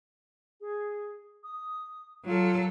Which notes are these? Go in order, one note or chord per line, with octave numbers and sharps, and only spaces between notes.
G#4
D#6
F#3 F4 A4